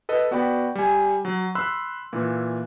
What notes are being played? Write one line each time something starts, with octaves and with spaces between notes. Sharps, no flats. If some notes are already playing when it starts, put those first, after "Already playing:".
A4 B4 D#5
B3 F#4 D5 G5 B5
G3 G#5
F#3
B5 C6 E6 F#6
A#2 E3